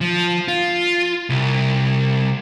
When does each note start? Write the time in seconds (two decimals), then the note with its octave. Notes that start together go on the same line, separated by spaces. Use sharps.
0.01 F3
0.48 F4
1.30 C2